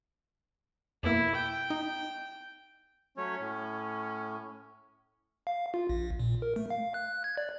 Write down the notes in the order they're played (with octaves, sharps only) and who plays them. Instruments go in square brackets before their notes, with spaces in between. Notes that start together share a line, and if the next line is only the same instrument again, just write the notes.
[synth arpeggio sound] F2 B2 A#3 [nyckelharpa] E4
[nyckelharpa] G5
[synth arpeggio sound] D#4
[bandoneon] F#3 A3 C#5 [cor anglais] C#4
[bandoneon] A2
[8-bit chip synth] F5
F4
A#1
A#2
A#4
A3
F5
F#6
G#6
D5